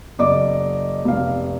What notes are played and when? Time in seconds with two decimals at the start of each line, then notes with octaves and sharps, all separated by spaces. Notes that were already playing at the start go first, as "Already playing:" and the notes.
0.19 F#1 D5 D#5 D6
1.05 F1 F5